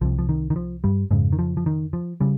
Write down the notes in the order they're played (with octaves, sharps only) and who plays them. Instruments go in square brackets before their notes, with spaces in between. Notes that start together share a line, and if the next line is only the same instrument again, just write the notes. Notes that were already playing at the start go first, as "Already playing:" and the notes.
[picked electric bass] C2 C3 F3
F3
D#3
D#3
F3
G2 G3
F2 G#2 C#3 G#3
D#3
F3
F3
D#3
F3
C#3 G3